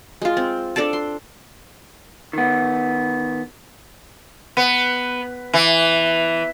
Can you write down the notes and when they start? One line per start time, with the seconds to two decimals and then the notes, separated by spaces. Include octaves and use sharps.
0.22 G#3 F4
0.37 C4
0.76 D4 A4 D5 A5
0.93 C6
2.33 D#3 B3
4.57 B3
5.53 E3